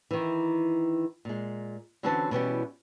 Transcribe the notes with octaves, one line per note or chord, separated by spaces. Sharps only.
D#3 E3
A#2 G#3
D3 E3 C4 C#4 F#4 A5
B2 E3 G3 C#4